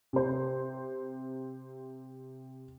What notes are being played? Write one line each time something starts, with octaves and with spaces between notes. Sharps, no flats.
C3 C5